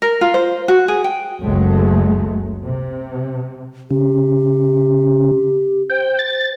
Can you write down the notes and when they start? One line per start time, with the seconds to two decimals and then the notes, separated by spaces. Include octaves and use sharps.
0.02 A#4
0.21 F4
0.34 C5
0.68 F#4
0.88 G#4
1.04 G5
1.42 F#1 C#2 F#3 G#3 A3
2.65 C3
3.91 C#3 G4
5.90 C5 G5
6.19 A6